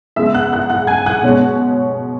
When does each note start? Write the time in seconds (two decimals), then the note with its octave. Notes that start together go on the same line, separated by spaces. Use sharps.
0.16 C#3 G#3 B3 E5 E6
0.34 F#5 F#6
0.53 F#5 F#6
0.70 F#5 F#6
0.87 G#5 G#6
1.06 F#5 F#6
1.23 B2 G#3 C#4